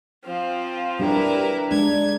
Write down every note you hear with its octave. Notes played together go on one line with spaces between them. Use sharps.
F3 C4 F4
G3 D4 E4 G4 A#4 B4
G#3 D4 G#6